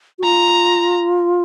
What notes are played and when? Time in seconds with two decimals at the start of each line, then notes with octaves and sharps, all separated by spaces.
0.19 F#4
0.24 F4 A#5